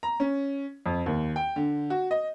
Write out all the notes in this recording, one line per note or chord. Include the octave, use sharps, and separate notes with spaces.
A#5
C#4
F2
D#2
G5
D3
F#4
D#5